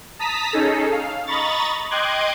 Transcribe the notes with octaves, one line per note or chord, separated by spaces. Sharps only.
A5 A#5 D#6 B6
C#4 D#4 G#4 A4
F5
D#5 A#5 B5 C#6 A6
D#5 G5 C6 D6 F#6 G#6